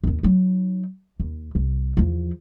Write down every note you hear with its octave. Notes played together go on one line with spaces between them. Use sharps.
D#2 C4
F#3 D#4
D#2
C2
E2 F3